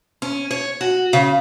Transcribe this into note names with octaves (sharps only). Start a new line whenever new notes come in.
C#4
C#5
F#4
C#3